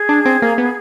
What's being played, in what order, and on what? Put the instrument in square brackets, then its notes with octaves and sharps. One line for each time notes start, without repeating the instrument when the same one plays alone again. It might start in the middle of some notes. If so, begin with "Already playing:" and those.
Already playing: [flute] G#4
[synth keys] D4
C4
A#3
B3